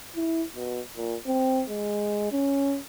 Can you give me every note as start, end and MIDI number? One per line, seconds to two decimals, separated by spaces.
0.15 0.44 64
0.55 0.80 47
0.96 1.15 46
1.27 1.63 60
1.69 2.30 56
2.32 2.78 61